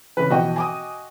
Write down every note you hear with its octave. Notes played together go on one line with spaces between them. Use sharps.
C#3 E3 B4
B2 E3 F3 F#4 D#5 G5
G#5 D6 D#6